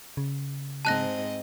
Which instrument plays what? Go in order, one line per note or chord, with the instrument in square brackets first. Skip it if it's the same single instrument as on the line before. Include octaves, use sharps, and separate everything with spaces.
[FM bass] C#3
[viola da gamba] G#2 C4 D#5 [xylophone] A5 F#6 A#6